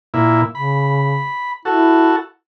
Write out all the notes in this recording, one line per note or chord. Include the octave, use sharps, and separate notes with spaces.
A#2 E4
C#3 B5
E4 F#4 A4